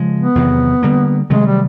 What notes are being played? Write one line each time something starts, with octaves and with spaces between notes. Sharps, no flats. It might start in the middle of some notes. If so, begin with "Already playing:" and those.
Already playing: C#3 F3 G#3
B3
E2 C3 D#3 F#3
D3 G3 A#3
C3 D#3 F#3 G#3 A3
G3